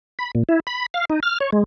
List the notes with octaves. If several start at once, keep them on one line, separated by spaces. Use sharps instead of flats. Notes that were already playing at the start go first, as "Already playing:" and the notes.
B5
A#2
E4
B5
F5
D#4
F6
C#5
G#3